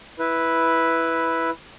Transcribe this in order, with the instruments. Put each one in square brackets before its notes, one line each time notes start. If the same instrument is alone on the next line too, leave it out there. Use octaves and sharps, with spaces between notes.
[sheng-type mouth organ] E4 B4